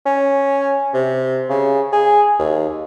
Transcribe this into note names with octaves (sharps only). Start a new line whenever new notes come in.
C#4
C3
C#3
G#4
D#2